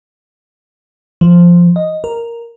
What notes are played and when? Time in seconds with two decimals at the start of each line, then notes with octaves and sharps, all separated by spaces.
1.21 F3
1.76 D#5
2.04 A#4